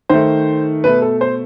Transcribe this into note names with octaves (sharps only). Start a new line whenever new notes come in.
D#3 A3 C5
B2 A3 B4
A4
C5